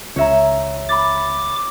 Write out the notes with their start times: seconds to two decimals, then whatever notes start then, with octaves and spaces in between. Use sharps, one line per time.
0.16 C#2 C#5 E5 A#5
0.89 B5 D6 A6